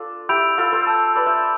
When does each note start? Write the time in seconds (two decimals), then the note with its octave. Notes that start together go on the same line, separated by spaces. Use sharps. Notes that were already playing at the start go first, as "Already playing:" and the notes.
Already playing: D4 F4 A4 D5
0.29 E4 G4 B5 E6 G6 D7 F7
0.58 F4 A4
0.72 A4 C5
0.87 A5 E6 G6
1.16 B4 D5
1.26 C5 E5